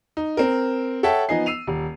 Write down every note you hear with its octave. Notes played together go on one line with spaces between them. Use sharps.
D#4
C4 A#4
A4 C#5 E5 F#5 G5 A5
F3 B3 D#4 D#5 G#5 C7
E6 C7 D#7 F7
D#1